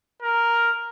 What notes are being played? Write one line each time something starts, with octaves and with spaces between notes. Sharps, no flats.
A#4